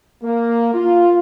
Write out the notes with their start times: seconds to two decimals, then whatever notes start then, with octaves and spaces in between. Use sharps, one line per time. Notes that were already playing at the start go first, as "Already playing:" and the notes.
0.23 A#3
0.74 F4